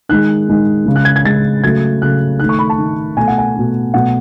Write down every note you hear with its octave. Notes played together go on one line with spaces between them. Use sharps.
D#3 G#3 F#6
D#3 G#3
C#3 G#3
F#6
G#6
G#6
C#3 G#3 A6
C#3 F#3 A3 G#6
C#3 F#3 A3 F#6
D#3 A3 F#6
C#6
B5
A5
D#3 A3
B2 A3 G#5
F#5
G#5
B2 A3
B2 F#3 A3 F#5